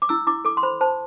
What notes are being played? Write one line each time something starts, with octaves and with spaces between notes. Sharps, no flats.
D6
E4 E6
E4 D6
A4 D6
C6
C5 B5
C5 A5